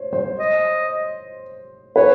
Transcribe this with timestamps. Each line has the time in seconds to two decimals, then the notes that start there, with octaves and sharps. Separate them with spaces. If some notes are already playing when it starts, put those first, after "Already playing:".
Already playing: C5 C#5
0.13 C5
0.39 D#5
1.96 B4 C#5